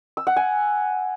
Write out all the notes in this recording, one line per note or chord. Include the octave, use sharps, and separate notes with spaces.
E6
F#5
G#5